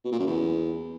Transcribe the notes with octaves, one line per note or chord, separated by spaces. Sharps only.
B2
A#2
F#2
E2